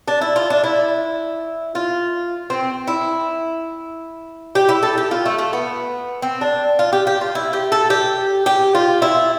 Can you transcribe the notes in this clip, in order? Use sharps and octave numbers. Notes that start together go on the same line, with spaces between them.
D4
E4
F4
D4
E4
F4
C4
E4
G4
E4
A4
G4
F4
A3
A3
B3
C4
D4
F4
G4
G4
F4
E4
G4
A4
G4
G4
F4
E4